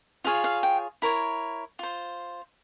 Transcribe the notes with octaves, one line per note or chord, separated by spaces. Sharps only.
F4 G#4 C#5 F5
F5
G5
E4 A#4 C#5
F4 C5